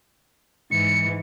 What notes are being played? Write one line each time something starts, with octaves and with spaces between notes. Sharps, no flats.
G#2 E3 C#7